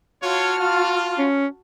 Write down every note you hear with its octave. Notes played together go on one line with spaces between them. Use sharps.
F4 F#4 C#5 A5 F6
F4
C#4